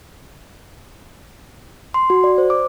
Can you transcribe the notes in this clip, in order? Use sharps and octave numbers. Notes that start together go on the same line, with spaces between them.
C6
F#4
D5
C5
D6